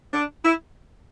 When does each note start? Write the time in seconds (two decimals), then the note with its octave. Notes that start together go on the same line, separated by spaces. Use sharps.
0.14 D4
0.44 E4